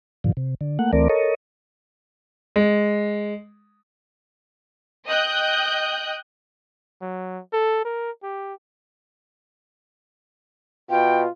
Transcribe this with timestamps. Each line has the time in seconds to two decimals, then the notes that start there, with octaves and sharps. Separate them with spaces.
0.24 G2 A#2 D3 F3
0.37 C3
0.61 D3
0.79 A3 A#3 F#5
0.93 D2 E3 A3 C4 A#4 D5
1.09 A4 A#4 C#5 D#5
2.56 G#3
5.06 D#5 G5 D#6 F#6 G6
7.01 F#3
7.53 A4
7.85 A#4
8.23 G4
10.90 B2 F4 G5